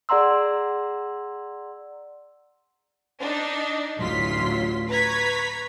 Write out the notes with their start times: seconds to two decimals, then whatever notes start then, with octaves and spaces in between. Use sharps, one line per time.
0.09 G#4 D5 F#5 A#5 C6 E6
3.20 D4 D#4
3.98 A1 D2 F#3 F4 C6 B6
4.89 B4 A#5 C#6 G#6 B6